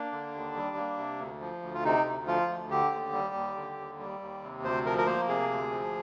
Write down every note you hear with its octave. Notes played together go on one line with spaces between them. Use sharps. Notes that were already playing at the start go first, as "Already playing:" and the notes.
Already playing: A#3 D4
D3
D#2
G3
A#3
C3
D2
F3
D2
F4
C3 D#4
D2
F3 F4
D2
D3 G4
D#2
G3
D#2
D3
D#2
G3
D#2
C3
D2 C5
F3 A#4
A#4
A#3 C5
C3 G#4
D2
F3